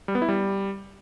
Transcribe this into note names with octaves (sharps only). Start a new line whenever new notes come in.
G3
B3
E4
G3